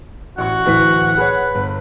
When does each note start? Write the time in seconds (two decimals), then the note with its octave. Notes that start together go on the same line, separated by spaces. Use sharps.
0.38 A1 F#4 F#5 C#6
0.65 D1 E3 B6
1.18 G#4 B4 C#5
1.55 G1